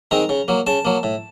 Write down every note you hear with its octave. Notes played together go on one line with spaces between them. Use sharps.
D#3 G#3 C4 A#5
C#3
F#3 A#3
C#3 A5
F#3 A#3
A2